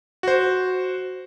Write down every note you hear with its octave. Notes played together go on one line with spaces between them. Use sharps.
F#4 C5